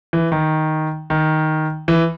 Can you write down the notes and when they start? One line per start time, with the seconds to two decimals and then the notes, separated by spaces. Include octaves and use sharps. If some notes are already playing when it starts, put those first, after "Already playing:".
0.13 E3
0.32 D#3
1.10 D#3
1.88 E3